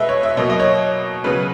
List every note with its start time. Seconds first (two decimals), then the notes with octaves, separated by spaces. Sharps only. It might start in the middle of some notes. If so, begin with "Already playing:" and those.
Already playing: B2 G#3 B4 D#5 E5
0.09 C#5
0.23 E5
0.37 B2 F#3 A#3 D#5
0.50 D#5
0.60 C#5
1.24 C#3 F#3 B3 B4